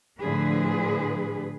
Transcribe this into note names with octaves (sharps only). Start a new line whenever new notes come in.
A2 D3 F3 G#4 B4